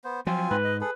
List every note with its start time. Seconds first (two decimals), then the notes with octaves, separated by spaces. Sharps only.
0.04 B3 C5
0.27 F3 F#3 C4 F4 G#5
0.51 G#2 B4
0.64 D#5
0.81 G#4 A4 B4